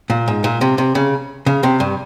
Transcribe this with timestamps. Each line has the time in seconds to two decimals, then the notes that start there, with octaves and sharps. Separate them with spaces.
0.10 A#2
0.28 G#2
0.44 A#2
0.61 C3
0.78 C3
0.95 C#3
1.46 C#3
1.63 C3
1.80 G2